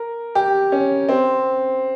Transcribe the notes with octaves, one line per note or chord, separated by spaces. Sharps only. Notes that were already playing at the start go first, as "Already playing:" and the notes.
Already playing: A#4
G4
C#4
C4